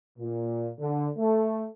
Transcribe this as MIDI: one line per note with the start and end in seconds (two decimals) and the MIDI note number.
0.19 0.70 46
0.79 1.09 50
1.18 1.67 57